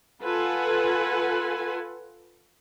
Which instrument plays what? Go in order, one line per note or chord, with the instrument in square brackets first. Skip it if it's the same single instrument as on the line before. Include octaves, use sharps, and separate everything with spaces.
[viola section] F4 A4 B4 F#5 G#5